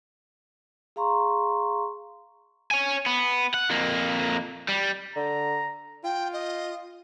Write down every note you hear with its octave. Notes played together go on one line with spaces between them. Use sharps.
G#4 F5 A#5 C6 C#6
C#5 G#5
B3
F#5
F2 A#3
G3
D3 A#5
F4 G5
D#5